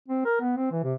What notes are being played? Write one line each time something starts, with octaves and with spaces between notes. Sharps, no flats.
C4
A#4
B3
C4
E3
C3